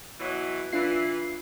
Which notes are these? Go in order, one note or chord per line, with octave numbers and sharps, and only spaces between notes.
B2 E3 F#3
E3 D4 F4 C7